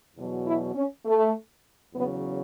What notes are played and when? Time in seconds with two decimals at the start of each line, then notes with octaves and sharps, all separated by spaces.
0.15 E2 B2 F#3
0.44 E4
0.74 C#4
1.04 A3
1.93 E2 C#3 F#3 B3